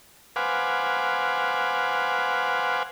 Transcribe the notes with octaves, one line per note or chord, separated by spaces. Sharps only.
B4 C5 F5 F#5 G#5 D6